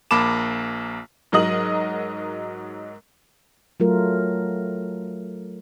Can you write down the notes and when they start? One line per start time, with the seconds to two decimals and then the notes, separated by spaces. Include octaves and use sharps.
0.11 A#1 A#3 A5 B5 D6 E7
1.32 G#2 F#3 A#4 D#5 D#6 F#7
3.80 F#3 A3 F4 A#4